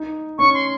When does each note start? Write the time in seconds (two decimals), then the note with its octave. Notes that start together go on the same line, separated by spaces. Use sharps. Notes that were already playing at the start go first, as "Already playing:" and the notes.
Already playing: D#4
0.38 C#4 C#6
0.54 C6